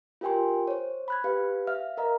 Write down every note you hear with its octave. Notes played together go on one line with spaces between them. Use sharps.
F4 G4 A#4 G5 G#5 C6
C5 C#5
B5 F#6 G#6
G4 B4 F5
E5 F5 F6
A#4 D#5 F5 A#5